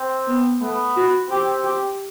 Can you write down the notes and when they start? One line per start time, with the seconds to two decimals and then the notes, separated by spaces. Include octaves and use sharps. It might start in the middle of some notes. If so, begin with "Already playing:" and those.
Already playing: C4
0.26 B3
0.61 A3 B3
0.96 F#4
1.30 C4 G4
1.64 G4